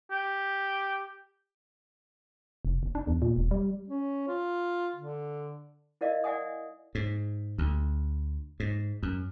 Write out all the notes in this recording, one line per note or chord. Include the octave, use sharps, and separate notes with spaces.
G4
F1
F#1
D4
E2
A#2
E1
G3
C#4
F4
D3
E4 A#4 D5 D#5 F5
D5 E5 F#5 G#5 D#6
G#2
D2
G#2
F#2